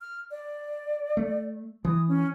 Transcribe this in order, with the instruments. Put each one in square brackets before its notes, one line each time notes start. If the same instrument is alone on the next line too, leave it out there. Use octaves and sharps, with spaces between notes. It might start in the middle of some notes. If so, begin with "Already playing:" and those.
[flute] F6
D5
[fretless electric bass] A3
[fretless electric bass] E3 [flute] D#6
[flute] C#4